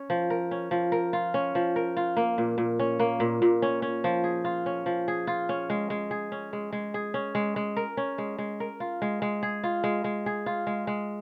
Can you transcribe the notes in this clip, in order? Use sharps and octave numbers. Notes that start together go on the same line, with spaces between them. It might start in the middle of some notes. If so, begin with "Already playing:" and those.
Already playing: C#4
F3
A#4
C#4
F3
A#4
F4
C#4
F3
A#4
F4
A#3
A#2
A#2
C#4
A#3
A#2
A#2
C#4
C#4
F3
G#4
F4
C#4
F3
G#4
F4
C#4
G#3
G#3
G#4
C#4
G#3
G#3
G#4
C#4
G#3
G#3
A#4
C#4
G#3
G#3
A#4
F4
G#3
G#3
G#4
F4
G#3
G#3
G#4
F4
G#3
G#3